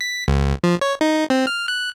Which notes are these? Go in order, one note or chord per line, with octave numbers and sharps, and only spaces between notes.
B6
C#2
F3
C#5
D#4
C4
F6
F#6